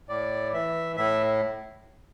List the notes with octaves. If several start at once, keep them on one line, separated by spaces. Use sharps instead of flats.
A2 D5
E3 E5
A2 E5